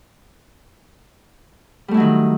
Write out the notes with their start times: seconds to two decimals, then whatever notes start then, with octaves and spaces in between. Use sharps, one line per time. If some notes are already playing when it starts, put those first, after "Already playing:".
1.88 G3
1.91 A3
1.94 E4
1.97 F#3
2.00 D#3